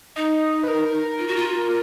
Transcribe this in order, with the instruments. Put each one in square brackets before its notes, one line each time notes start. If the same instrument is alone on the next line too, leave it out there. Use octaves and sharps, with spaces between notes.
[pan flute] D#4 [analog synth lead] D#5
[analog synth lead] B4
A#4
[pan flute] F4
F#4
F4